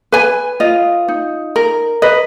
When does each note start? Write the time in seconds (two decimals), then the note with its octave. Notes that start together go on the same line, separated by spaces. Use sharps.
0.12 B4 G#5
0.60 F4 D#5
1.08 D#4
1.56 A#4
2.02 B4 D#5